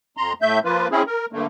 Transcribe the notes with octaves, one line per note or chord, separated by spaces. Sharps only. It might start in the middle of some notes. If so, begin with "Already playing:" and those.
F2 A#5 C6
A2 A3 E5 G6
F3 A#3 F4 B4
C4 C#4 E4 G#4
A#4
G2 D3 A3 A#3